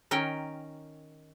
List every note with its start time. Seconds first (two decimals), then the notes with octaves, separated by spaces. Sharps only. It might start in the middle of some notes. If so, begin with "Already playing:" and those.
0.11 D#3 C#4 A#4 G5